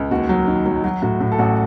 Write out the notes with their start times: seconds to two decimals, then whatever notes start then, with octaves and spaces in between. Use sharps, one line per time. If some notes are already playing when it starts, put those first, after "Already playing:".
Already playing: C#2
0.11 D#2 F#4
0.29 F#3
0.48 D#3
0.66 F#3
0.84 F#3
1.02 A2 F#4
1.21 A2
1.32 A4
1.38 A1 F#4